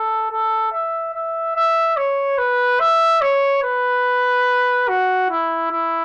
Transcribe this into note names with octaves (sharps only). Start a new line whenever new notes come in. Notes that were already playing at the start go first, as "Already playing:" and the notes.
Already playing: A4
A4
E5
E5
E5
C#5
B4
E5
C#5
B4
F#4
E4
E4